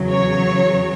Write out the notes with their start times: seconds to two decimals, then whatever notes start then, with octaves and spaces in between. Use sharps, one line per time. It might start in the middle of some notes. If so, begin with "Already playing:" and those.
Already playing: E2 C#3 F#3
0.09 C#5